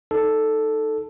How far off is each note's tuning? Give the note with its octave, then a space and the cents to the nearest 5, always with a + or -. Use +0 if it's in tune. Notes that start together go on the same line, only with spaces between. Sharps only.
D#4 +0 A4 +0